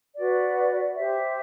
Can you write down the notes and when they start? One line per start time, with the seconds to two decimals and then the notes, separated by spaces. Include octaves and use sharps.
0.15 F#4 B4 D5
0.94 G4 C5 E5